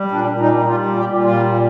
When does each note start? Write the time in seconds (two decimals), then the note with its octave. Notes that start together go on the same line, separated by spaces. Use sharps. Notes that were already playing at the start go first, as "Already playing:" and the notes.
Already playing: G3
0.11 A#2 D4
0.30 A#2
0.40 D#4
0.49 G3
0.68 G3 F4
0.87 A#2
0.96 G4
1.05 A#2
1.24 G3 F4
1.43 A#2